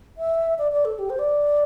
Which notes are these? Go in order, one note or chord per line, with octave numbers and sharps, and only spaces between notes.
E5
D5
D5
A4
G4
C5
D5